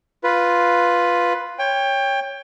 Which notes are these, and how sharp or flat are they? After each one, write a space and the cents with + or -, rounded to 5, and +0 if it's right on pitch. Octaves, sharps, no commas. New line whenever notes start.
F4 +0 B4 +0
C#5 +0 G5 +20